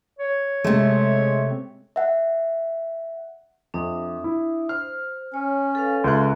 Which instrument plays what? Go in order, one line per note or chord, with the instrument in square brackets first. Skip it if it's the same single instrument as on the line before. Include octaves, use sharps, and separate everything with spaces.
[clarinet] C#5
[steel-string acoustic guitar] C3 A3 [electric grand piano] G#3
[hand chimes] E5 F#5
[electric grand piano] F2 [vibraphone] D4 E5 D#6
[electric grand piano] E4
[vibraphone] C5 [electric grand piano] F6
[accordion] C#4 [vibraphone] C#5
[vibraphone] A4 B4 F5
[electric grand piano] C#2 E5 F#6 [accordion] C6